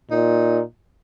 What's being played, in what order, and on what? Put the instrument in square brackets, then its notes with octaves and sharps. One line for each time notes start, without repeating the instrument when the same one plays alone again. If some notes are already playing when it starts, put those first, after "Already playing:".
[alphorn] A#2 [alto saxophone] D#4